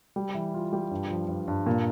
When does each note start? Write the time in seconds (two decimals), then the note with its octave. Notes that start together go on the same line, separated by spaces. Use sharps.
0.16 G3
0.35 E3
0.54 F4
0.73 G3
0.91 G2
1.10 F3
1.28 G2
1.48 G2
1.66 A#2